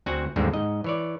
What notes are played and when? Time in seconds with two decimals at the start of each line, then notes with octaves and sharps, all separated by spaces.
0.06 D2 C4 F#4 F#5 G#5
0.36 D#2 G#2 D3 G3 G#3 C4
0.54 G#2 D#5
0.84 E3 C#5 D5